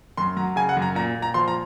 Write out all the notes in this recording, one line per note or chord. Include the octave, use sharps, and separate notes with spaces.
F#2 C6
F#3 A#5
C#3 G#5
F#5
F#2
A#5
A#2 A#5
A#2
A#5
F3 C6
A#5